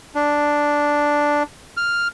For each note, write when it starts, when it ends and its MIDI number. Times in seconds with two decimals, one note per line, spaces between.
0.15 1.43 62
1.77 2.08 89